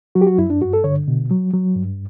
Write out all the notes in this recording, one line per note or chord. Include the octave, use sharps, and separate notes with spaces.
F#3 F#4
G4
F#4
F#2 E4
D4
G2 F#4
A4
D3 C#5
B2
F#3
F#3
G2